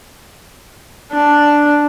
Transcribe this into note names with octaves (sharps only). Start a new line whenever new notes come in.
D4